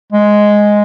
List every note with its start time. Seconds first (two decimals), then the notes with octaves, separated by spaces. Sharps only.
0.12 G#3